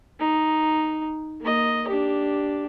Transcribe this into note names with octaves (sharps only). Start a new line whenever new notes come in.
D#4
A#3 D#5
D4 G4